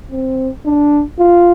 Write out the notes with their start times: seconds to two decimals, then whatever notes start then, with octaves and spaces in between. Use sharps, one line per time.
0.11 C4
0.65 D4
1.19 F4